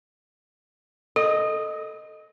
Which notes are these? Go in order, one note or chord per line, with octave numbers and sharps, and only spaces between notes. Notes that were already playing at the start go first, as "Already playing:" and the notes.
A4 D#5